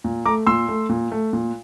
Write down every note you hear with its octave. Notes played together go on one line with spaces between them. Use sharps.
A#2
A3 A#5 D6
A#2 C6 E6
A3
A#2
A3
A#2